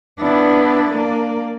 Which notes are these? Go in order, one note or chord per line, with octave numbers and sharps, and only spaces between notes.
B3 D4 E4
A#3 D5